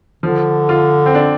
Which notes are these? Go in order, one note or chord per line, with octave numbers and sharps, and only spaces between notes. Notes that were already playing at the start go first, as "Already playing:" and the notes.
D3 F3
F4
C4
D4